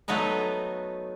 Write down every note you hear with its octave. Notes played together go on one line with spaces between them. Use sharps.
F#3 A3 B3 D#4 B4